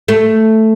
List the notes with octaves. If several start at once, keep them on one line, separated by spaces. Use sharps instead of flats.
A3